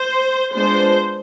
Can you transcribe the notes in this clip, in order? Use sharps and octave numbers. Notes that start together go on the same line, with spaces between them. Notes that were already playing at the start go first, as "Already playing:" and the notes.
Already playing: C5
G#3 B3 D4 F4 C5